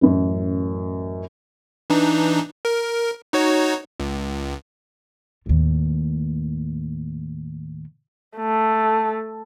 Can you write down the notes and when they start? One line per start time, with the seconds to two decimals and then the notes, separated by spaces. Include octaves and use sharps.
0.01 A1 F#2
1.90 E3 D4 D#4
2.65 A#4
3.33 D#4 F#4 C#5
4.00 C#2
5.46 D#2 A2
8.37 A3